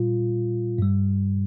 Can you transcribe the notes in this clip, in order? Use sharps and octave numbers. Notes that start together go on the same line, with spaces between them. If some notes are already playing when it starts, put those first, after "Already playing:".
Already playing: A#2 G3 F4
G2 G3